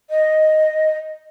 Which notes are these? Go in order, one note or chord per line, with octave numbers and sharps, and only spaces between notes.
D#5